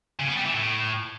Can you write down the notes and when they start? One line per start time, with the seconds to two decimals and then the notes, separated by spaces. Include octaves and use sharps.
0.20 C#3
0.28 B3
0.37 G3
0.45 E3
0.54 A2